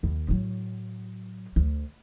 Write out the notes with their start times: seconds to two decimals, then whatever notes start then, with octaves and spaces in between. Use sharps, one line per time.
0.03 D#2
0.28 A2 F#3
1.56 D2